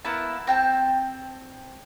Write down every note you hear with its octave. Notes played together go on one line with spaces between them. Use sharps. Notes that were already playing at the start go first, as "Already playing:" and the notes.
A#3 B3 E4 A5
C4 G5 A5